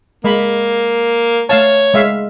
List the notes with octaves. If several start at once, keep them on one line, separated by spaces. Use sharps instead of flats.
G#3 A#3 B5
A3 C#5 F5 A5
G#3 E5 F5